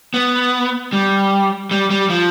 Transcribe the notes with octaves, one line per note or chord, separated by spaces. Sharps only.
B3
G3
G3
G3
F3